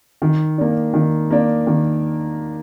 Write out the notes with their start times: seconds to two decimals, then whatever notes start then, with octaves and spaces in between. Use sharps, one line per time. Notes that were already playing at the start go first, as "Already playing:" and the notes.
0.22 D#3
0.58 A#3 D4
0.94 D#3
1.31 A#3 D4
1.67 D#3